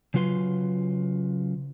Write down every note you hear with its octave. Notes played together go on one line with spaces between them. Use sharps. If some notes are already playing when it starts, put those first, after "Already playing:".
C#3 F#3 F4 B4 C6